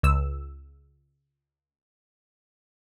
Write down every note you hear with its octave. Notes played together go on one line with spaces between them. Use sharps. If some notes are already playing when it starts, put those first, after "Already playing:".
C#2 E6